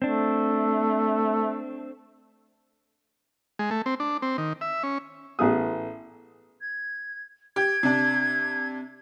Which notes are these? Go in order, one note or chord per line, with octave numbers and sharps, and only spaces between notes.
A3 C4 D4
G#3
A3
C4
D4
C4
D#3
E5
C#4
A1 B3 G#4 D#6
G#6
G4 G#6
C3 D4